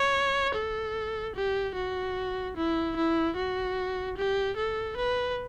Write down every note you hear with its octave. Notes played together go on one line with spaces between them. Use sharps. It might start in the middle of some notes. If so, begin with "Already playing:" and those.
Already playing: C#5
A4
G4
F#4
E4
E4
F#4
G4
A4
B4